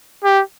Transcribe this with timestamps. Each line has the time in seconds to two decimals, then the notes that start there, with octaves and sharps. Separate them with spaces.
0.24 G4